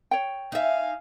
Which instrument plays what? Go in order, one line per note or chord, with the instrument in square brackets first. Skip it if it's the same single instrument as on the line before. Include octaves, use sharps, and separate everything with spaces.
[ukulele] C#5 G5
[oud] D#4 E5 [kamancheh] F5 G#5